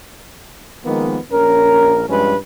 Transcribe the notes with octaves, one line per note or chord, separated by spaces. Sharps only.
D#3 F3 G#3 A#3 B3
A#1 C#4 A#4
G2 F3 G#3 C#4 B4